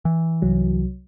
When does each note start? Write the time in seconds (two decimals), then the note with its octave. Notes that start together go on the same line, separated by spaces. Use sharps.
0.05 E3
0.42 C2 F#3